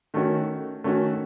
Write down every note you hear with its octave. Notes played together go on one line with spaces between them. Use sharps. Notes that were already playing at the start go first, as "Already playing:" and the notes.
D#3 A3 C#4 F#4
D#3 A3 C#4 F#4